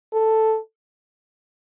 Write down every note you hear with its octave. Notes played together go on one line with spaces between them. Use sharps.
A4